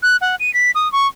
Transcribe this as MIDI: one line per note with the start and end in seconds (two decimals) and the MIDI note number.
0.03 0.17 90
0.21 0.36 78
0.40 0.53 99
0.54 0.71 95
0.75 0.90 87
0.92 1.07 85